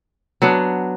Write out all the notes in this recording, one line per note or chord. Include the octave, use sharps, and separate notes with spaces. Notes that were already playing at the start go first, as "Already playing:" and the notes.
F#3 B3 D4